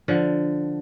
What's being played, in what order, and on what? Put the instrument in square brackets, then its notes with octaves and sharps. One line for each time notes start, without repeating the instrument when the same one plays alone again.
[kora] D3 F3